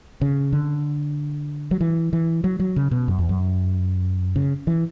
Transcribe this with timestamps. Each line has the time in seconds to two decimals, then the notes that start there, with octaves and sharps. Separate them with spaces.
0.21 C#3
0.53 D3
1.71 F#3
1.81 E3
2.13 E3
2.44 F#3
2.60 F#3
2.76 C#3
2.91 B2
3.08 F#2
3.18 E2
3.29 F#2
4.36 C#3
4.67 E3